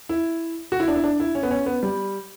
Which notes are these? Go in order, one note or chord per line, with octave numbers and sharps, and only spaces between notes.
E4
F#4
E4
D4
E4
D4
E4
C#4
B3
C#4
B3
G3